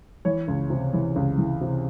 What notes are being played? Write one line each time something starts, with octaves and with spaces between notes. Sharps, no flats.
E3 C#5
C#2
C3
E3
C#2
E3
C3